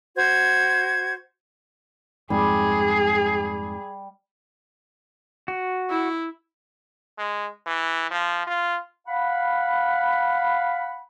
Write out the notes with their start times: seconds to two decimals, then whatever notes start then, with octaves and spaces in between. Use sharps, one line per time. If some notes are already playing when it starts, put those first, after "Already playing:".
0.16 F#4 C5 G#6
2.30 F2 G#2 G3 G#4
5.48 F#4
5.90 E4
7.18 G#3
7.66 E3
8.11 F3
8.47 F4
9.08 F5 F#5 B5